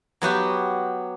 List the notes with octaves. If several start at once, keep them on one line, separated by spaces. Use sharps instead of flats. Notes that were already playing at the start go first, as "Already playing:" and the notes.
F#3 B3 F#4 G4